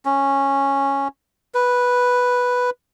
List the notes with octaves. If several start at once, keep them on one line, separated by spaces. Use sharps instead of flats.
C#4
B4